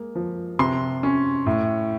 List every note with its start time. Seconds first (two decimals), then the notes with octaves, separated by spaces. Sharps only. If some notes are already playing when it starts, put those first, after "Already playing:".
Already playing: G#3 A#3
0.15 F3
0.59 C3 C6
1.03 C#4
1.46 A2